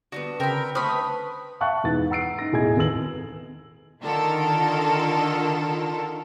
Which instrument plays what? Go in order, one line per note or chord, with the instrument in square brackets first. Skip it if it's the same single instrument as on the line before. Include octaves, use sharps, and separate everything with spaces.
[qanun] D3 G3 B3 [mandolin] F#4
[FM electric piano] C#3 [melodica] C4 G5 [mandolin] A#4 B5
[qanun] A3 B4 [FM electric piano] C5 B6 [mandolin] B5 D#6 F6 [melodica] C#6
[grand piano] E5 F5 G5 A5 C#6 F#6
E1 E2 G#2 E3 A6
F#5 A#5 E6 C7 D7
D#4 A#6
E1 A2 G#4 D#5 G#5 G#6
G#1 D#2 A4 B4 E6 F#7
[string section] D3 D#3 F4 A4 A#4